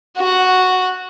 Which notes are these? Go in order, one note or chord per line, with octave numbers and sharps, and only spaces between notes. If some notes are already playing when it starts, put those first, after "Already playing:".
F#4 F#5